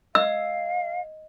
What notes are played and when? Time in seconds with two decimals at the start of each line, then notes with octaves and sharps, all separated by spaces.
0.15 D#5 F5 E6